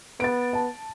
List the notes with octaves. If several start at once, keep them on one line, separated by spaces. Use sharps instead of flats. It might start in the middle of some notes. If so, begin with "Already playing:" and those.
B3 A6 D7
A5